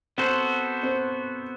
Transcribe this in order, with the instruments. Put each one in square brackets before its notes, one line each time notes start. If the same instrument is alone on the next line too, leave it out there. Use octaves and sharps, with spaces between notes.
[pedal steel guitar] B3 F#4 A4 C5 [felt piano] C4
[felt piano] C4